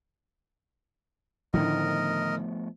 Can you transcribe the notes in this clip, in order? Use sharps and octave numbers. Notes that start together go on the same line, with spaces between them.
A2 D3 D#3 F3 A3 B3 A#4 D#5